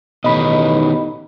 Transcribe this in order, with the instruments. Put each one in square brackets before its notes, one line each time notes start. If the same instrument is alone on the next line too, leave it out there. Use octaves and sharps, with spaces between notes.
[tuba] A1 [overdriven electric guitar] B2 D#3 [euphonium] D#4 [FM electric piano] D#5 B5